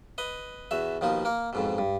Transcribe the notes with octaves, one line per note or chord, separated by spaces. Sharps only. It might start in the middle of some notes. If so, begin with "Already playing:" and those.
B4 D#5
E2 F#4 E5
D#2 B2 F3 D#4
A#3 A#4
F2 G#2 B2
G2